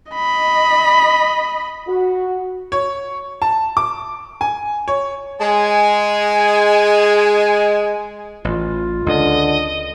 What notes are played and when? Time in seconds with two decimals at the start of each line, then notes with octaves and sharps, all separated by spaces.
0.12 D#5 B5
1.88 F#4
2.72 C#5
3.42 A5
3.77 D6
4.41 G#5
4.88 C#5
5.41 G#3 G#5
8.45 A1 F4
9.06 C#2 D3 D#5